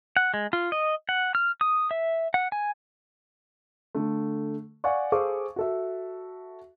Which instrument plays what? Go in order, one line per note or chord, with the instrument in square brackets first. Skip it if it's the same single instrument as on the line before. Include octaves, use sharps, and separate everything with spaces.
[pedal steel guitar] F#5
G#3
F4
D#5
F#5
F6
D#6
E5
F#5
G#5
[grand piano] D3 A3
D5 F5 F#5 G#5 C#6
G#4 A4 C5 F5 C#6 D6
F#4 A4 E5